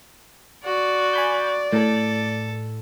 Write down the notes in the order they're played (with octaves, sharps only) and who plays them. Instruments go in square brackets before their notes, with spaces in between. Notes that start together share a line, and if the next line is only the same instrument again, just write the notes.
[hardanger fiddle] F#4 [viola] D5
[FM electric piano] G#5 B5 G6
[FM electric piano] A2 [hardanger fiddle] A4